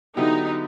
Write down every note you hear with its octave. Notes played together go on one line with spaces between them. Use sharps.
D3 F#3 B3 D#4 E4 G4